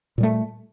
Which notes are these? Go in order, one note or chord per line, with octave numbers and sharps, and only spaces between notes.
A#2 G3 A3